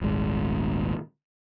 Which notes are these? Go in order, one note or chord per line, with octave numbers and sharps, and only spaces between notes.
D#1 G#1 G#3